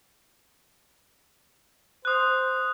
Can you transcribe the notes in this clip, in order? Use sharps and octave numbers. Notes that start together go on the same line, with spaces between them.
C5 D#6 F#6